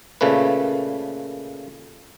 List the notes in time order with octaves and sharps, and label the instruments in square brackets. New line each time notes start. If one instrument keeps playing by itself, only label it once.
[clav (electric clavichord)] A#2 C#3 A3 B4